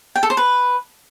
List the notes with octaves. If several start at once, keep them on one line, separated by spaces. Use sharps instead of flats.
G5
A4
C5
B4